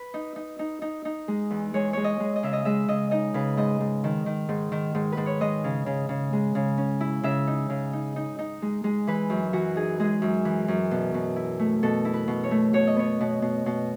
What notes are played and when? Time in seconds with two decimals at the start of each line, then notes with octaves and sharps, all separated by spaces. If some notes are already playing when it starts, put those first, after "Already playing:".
Already playing: B4
0.14 D#4
0.36 D#4
0.59 D#4
0.82 D#4
1.05 D#4
1.28 G#3
1.50 E2
1.74 G#3 C#5
1.93 G#3 C#5
2.04 D#5
2.20 G#3
2.36 D#5
2.43 C#3 E5
2.53 D#5
2.65 G#3 E5
2.88 C#3 D#5
3.11 D#4 D#5
3.34 C#3 B4
3.57 G#2 D#5
3.80 G#2
4.04 D#3
4.26 D#3
4.49 G#2
4.72 D#3
4.95 G#2
5.12 G#2 B4
5.26 C#5
5.41 G#3 D#5
5.64 C#3
5.86 C#3
6.09 C#3
6.33 G#3
6.55 C#3
6.78 C#4
7.01 E4
7.23 C#3 E5
7.47 D#4
7.70 C#3
7.93 D#4
8.16 D#4
8.39 D#4
8.62 G#3
8.84 G#3
9.07 E3 B4
9.30 F#2
9.53 E3 F#4
9.76 D#4 G#4
9.99 G#3 G#4
10.22 F#2
10.45 E3
10.68 F#2
10.91 B2
11.14 B2
11.36 E4
11.59 A3
11.83 B2 A4
12.05 E4
12.13 B4
12.28 B2
12.44 C#5
12.51 A3
12.73 B2 C#5
12.87 D#5
12.96 B3 C#5
13.21 B2
13.42 B2
13.66 B2